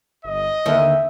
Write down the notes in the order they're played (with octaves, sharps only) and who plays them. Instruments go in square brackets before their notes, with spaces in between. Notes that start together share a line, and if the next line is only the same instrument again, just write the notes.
[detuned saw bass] G1 [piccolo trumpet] D#5
[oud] D#2 [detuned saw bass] D3 [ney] E5